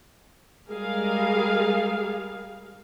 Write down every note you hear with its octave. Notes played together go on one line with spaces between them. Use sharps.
G3 G#3 G#4 A#4 F5